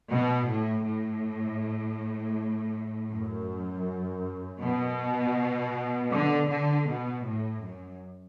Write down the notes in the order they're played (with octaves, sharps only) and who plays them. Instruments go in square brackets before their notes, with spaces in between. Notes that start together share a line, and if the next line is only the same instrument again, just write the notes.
[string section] B2
A2
A2
F#2
B2
D3
D3
B2
A2
F#2